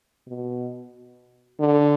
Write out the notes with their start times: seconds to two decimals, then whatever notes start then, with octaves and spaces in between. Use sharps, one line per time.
0.27 B2
1.60 D3